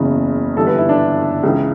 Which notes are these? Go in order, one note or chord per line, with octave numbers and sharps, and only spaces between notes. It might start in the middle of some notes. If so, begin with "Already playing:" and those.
Already playing: F#1 E2 C#3 E3
G1 G2 E3 A4
B4
E4
D4
C#2 C#3 E3